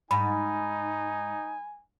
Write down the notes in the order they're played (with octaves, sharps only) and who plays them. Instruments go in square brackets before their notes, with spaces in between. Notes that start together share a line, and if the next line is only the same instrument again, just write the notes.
[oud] G#2 [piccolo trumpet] D#4 [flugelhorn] G#5 [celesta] B5